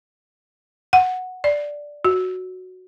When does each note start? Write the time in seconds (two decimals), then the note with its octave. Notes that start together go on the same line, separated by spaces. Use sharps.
0.93 F#5
1.44 D5
2.05 F#4